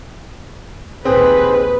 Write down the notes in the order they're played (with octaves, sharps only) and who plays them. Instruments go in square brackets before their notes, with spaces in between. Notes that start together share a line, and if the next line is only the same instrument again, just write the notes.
[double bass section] A#1 D#2 D#3 [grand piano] C4 [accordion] G#4 C5 [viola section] B4